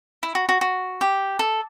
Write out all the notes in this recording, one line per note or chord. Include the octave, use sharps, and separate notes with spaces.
E4
F#4
F#4
F#4
G4
A4